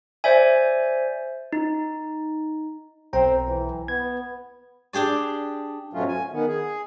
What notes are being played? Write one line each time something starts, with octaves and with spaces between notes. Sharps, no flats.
C5 D5 E5 G#5
D#4
B1 C4 G5 A#5
E3
B3 G#6
D4 G4 G#4 D5
G#2 B2 F#3 A3 C#4 F4
G#5
D#3 B3
G#4